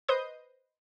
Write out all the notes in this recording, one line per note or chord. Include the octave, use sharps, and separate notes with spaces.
B4 C5 D#5 C6 D#6 G6